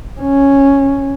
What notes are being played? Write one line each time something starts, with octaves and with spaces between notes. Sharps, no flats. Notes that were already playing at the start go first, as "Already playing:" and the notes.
C#4